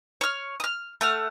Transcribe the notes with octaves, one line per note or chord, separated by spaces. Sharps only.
C#5 F6
D#6 F6
A3 F#5 F6